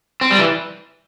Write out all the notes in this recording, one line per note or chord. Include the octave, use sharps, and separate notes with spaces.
C4
G3
E3